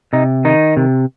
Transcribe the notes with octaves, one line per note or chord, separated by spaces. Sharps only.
C3 D#4
D#3 D#4
C3